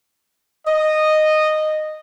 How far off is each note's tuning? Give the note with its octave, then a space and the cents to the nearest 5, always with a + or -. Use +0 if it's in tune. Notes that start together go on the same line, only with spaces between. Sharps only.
D#5 -10